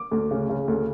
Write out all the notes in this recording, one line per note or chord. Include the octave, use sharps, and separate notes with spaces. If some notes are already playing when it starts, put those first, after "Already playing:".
Already playing: D6
D2
C#3
C#3
D2